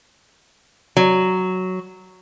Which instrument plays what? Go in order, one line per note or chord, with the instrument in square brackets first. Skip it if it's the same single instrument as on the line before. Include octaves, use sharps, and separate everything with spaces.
[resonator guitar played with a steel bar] F#3